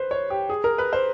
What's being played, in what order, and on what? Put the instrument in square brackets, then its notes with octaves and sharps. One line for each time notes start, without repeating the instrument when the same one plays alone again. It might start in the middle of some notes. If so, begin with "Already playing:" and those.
Already playing: [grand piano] B4 C5
C#5
G4
G#4
A#4
B4
C5